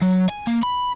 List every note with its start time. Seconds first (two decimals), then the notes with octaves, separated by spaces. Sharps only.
0.02 F#3
0.29 G#5
0.47 A#3
0.63 B5